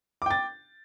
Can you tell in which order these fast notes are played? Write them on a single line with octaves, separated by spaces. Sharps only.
D6 G5 A6